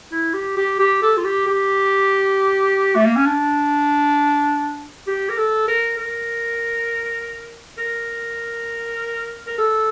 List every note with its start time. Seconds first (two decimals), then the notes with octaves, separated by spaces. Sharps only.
0.12 E4
0.33 G4
0.57 G4
0.79 G4
1.02 A4
1.17 F4
1.24 G4
1.46 G4
2.96 A3
3.05 A#3
3.16 C#4
3.26 D4
5.07 G4
5.29 A#4
5.37 A4
5.68 A#4
5.98 A#4
7.78 A#4
9.47 A#4
9.58 A4